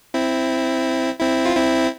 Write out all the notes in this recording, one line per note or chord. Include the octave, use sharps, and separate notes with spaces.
C4 E4
C4 E4
F4
C4 E4